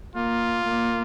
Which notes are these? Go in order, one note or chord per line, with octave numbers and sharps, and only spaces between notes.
A#3 F4
A#3